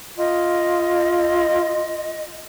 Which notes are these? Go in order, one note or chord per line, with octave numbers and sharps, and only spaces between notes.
F4 D#5